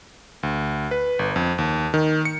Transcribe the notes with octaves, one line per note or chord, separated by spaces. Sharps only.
D2
B4
G1
F2
D#2
D#3
C#7